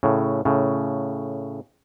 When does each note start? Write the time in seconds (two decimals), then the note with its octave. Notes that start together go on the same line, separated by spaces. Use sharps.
0.03 A2 C#3
0.45 A2 C#3